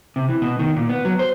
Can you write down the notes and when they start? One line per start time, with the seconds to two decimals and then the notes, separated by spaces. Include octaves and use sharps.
0.16 C3
0.29 E3
0.41 B2
0.59 D#3
0.76 A#2
0.89 B3
1.05 F#3
1.19 C5